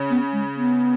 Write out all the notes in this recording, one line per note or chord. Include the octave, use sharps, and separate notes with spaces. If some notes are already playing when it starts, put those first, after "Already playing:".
Already playing: C#3 C#4
B3
G#3
B3